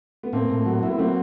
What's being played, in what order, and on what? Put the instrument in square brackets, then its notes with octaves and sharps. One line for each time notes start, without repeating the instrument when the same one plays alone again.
[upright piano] B3
[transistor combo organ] A2 [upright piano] A#3 C4
[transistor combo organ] A2
F#3
[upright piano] B3 [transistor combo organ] E4
[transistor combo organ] F#3 [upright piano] A#3 C4